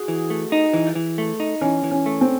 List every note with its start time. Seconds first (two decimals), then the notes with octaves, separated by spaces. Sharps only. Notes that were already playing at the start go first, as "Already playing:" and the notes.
Already playing: F#4 G#4
0.08 E3
0.30 A3
0.52 D#4
0.74 E3
0.95 E3
1.18 A3
1.40 D#4
1.61 E3 C#4
1.84 E3
1.91 C#4
2.06 A3
2.21 C4